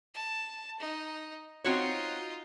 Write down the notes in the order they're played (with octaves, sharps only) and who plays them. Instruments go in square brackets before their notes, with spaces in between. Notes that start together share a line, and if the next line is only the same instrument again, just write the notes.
[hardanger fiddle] A5
D#4
[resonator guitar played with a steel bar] C4 F#4 C#5 [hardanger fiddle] D#4 F4